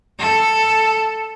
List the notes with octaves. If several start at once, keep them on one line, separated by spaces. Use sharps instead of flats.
A4